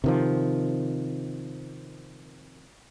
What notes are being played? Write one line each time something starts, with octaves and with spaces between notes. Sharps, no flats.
C3 D#3 F3